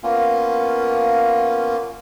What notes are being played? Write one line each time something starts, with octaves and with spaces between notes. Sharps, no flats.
A#3 B3 C#4 F4